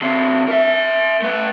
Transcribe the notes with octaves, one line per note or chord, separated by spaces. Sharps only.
D3 C4
A#4 E5
A3 B4